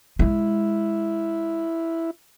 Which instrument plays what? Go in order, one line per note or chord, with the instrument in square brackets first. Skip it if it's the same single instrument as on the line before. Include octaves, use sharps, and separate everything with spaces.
[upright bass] G#3 [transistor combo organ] E4